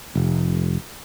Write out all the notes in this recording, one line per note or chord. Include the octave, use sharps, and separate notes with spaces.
F1